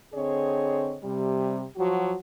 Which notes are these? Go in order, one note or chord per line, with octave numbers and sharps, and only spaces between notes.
D3 C4 G#4 C#5 D#5
C3 G3
F3 F#3 F#4